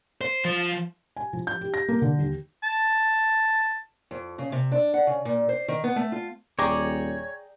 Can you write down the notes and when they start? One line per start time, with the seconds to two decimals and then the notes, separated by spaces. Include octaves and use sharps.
0.21 C5
0.45 F3
1.16 G#5
1.33 F3
1.47 G6
1.61 G4
1.74 A#6
1.89 A#3
2.02 D3
2.19 D#2
2.63 A5
4.11 F2
4.38 C#3
4.52 C3
4.72 D4
4.94 F#5
5.07 C#3
5.25 A#2
5.49 C5
5.68 D#3
5.84 B3
5.96 A3
6.12 F4
6.59 D#1 G#4 C#5 D5 G5 A#5